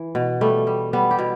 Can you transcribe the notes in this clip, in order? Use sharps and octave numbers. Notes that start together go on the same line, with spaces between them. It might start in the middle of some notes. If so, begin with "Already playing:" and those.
Already playing: E3
B2
G3 A3
G3
G3 B3
G4
B2